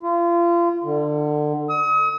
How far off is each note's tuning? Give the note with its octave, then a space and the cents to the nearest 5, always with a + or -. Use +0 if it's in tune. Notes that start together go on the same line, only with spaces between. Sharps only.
F4 -30
D3 +25
D#6 +40